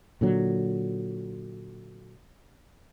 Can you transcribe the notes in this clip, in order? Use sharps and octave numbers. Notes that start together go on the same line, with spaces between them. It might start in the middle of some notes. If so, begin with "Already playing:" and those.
A#2 D3 F#3